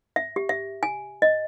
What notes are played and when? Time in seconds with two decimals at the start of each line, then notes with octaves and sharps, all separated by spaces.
0.16 E5
0.36 G4
0.49 E5
0.83 G#5
1.22 D#5